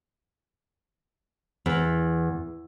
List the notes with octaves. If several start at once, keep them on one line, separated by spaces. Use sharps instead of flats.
E2